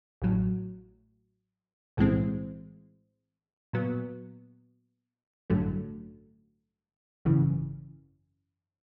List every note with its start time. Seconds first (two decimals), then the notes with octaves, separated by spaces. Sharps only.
0.22 A1 A2 F#3
1.97 B1 A2 E3 G#3 C4
3.73 A#2 F#3 B3
5.50 A1 G2 D3 F#3 A3
7.25 G#1 F#2 C#3 E3